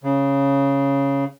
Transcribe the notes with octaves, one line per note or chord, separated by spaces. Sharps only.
C#3